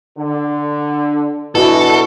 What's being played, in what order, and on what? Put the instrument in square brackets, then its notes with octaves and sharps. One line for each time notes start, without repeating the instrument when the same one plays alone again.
[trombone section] D3
[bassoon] B2 [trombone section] E3 D4 [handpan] E4 F#4 [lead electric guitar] A4